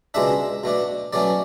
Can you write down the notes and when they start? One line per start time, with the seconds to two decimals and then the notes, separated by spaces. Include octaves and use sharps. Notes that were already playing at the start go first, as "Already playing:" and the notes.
0.14 C#2 B2 G#3 D4 E5
0.64 B2 A3 D4
1.13 B2 F#3 A3 C#4 D5